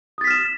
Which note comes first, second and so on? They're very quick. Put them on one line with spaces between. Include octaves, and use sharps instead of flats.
D#6 A6 B6 F6 E7